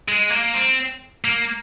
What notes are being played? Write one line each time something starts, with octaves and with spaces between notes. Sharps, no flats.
G#3
A#3
C4
A#3